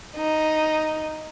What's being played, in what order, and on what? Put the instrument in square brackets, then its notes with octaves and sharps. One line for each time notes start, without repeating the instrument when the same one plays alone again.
[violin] D#4